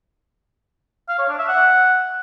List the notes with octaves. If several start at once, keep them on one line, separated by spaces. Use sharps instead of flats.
F5
C#5
D4
E5
F#5